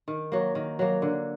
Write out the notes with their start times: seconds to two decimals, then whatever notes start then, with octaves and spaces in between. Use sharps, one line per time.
0.08 D#3
0.32 F#3 A#3
0.55 D#3
0.79 F#3 A#3
1.02 D3